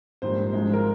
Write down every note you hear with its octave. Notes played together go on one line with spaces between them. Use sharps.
A#1 G#2 D#3 G3 C5
G#1 G#2 F3 G#3
A#4